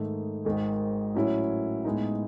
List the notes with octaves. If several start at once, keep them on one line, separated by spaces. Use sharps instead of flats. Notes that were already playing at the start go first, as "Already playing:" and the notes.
Already playing: G#2 D#3 A3 D#4
G#1 G#2 D#3 G#3
A2 F#3 C#4 E4
A2 G#3 B3 D#4